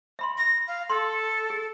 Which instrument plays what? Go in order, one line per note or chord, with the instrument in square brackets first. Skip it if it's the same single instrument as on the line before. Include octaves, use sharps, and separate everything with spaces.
[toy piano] E5 B5 C6
[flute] A#6
F5
[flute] A4 [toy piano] C6
[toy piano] G#4